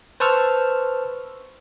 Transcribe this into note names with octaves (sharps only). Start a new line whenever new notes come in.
B4 C5 A5 C#6 E6 F6